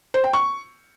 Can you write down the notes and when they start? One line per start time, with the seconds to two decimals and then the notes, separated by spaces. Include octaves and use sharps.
0.14 C5
0.24 G5
0.33 C#6